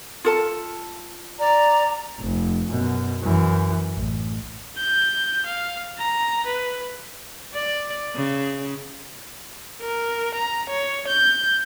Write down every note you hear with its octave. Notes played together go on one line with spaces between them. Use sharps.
F4 A4 A5
D5 A#5
F1
F#2 B2
F#2 E3
A1
G6
F5
A#5
B4
D5
C#3
A#4
A#5
C#5
G6